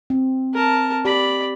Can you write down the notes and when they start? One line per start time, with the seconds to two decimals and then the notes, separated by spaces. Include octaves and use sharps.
0.10 C4
0.53 A#4 A5
1.05 G4 D5 B5